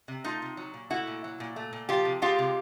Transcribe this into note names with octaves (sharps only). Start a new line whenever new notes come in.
C3
A3 D#4 F4
C3
F#3
A#2
A3 E4 F#4
A#2
F#3
A#2
A3
A#2
F3 F4 G4
C3
G#3 F4 G4
C3